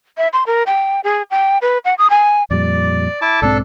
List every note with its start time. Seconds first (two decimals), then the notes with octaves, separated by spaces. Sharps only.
0.18 E5
0.33 C6
0.47 A#4
0.66 G5
1.04 G#4
1.31 G5
1.62 B4
1.85 F#5
1.98 D#6
2.10 G#5
2.51 F2 A#2 G3 D5
3.21 E4 A5 D6
3.42 B1 G#2 C4 D4 A4